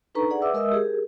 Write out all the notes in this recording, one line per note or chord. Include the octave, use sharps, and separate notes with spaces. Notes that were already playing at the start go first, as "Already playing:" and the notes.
D4 D#4 A4 B4 A#5 C#6
G#4 D5 F#5
B4 E5 D6 E6
G#3 A#4 D#5 E5 D#6 E6
G4 G#4 A#4